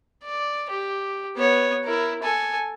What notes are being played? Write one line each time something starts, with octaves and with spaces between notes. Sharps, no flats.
D5
G4
B3 C#5
E4 A#4
A4 G#5